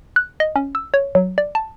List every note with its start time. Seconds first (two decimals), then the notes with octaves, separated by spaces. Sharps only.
0.16 F#6
0.40 D#5
0.56 C#4
0.75 E6
0.94 C#5
1.15 F#3
1.38 D5
1.55 A5